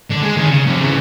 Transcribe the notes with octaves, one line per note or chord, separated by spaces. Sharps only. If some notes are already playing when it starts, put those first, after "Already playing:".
D3 D4
G#3
D#3 G#4
C#3
C3 F3
C#3 E3